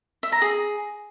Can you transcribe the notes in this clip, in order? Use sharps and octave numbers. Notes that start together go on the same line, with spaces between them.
E5
A#5
G#4